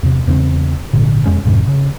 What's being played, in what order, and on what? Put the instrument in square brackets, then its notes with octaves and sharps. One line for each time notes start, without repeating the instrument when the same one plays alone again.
[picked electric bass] E2 C3
E2 C#3 A3 C4
G#1 A#2 D3
E1 F2 G#3 C#4
F1 F2 G#2 C3
C#3